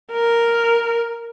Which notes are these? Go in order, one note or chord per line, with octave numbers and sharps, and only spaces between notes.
A#4